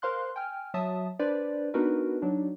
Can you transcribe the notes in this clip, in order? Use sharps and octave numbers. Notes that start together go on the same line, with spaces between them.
A#4 C5 F5 C6 F#6
G5 G#5 F6
F#3 E5 A5 D#6
D4 B4 C5 D5
B3 D4 D#4 F#4 A#4 B4
F#3 D4 D#4